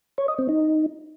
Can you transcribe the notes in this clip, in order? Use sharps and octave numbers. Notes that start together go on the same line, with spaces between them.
C#5
D#5
C4
D#4